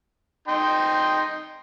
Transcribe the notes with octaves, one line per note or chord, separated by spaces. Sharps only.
D#4 G5 C6